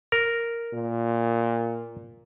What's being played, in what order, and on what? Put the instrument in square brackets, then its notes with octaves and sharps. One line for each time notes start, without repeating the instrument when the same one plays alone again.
[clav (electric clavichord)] A#4
[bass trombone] A#2